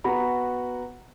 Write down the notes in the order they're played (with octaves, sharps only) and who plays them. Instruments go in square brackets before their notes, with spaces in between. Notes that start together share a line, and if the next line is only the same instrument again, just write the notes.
[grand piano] B3 F#4 F#5 A#5 B5